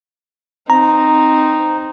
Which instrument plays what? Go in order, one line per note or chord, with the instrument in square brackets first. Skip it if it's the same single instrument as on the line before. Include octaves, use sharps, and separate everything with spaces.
[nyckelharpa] C4 D#4 [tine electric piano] A#5